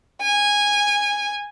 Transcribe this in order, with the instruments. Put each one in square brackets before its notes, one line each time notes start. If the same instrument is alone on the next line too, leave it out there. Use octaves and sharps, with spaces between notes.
[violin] G#5